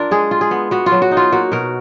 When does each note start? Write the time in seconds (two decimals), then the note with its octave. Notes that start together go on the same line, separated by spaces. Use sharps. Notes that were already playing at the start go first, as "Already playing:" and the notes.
Already playing: D4 F4 A#4
0.11 G#3 G#4
0.31 F4
0.41 G#4
0.51 B3
0.71 B3 F#4
0.86 F4
0.92 F#3
1.02 F#4
1.11 D#4
1.17 F4
1.32 A#3 F#4
1.52 B2 A#4